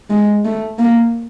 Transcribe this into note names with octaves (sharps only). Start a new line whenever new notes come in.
G#3
A3
A#3